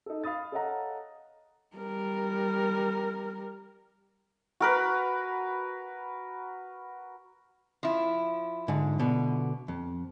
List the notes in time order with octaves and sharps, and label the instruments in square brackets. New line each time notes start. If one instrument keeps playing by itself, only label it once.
[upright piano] D#4 A4
F5 B5 D#6 A6
A4 C#5 D#5 F5 F#5 A#5
[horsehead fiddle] G3 A#4
[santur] F#4 A#4 B4
[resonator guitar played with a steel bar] F3 E4
[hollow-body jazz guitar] G#2 D3
B2 D3
F2